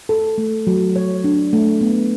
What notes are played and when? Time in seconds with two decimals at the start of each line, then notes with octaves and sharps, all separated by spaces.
0.09 A4
0.38 A3
0.67 F#3
0.96 C#5
1.24 D4
1.53 A3
1.81 B3